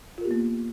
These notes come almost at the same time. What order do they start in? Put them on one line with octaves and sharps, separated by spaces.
F4 A#4 G4 B3 A#3